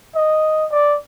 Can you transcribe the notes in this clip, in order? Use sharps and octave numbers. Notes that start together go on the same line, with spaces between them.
D#5
D5